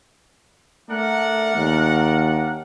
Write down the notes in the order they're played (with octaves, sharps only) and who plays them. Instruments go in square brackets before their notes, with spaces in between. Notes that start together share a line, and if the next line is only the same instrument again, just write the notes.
[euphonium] A3 [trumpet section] D4 A#4 F#5
[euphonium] D#2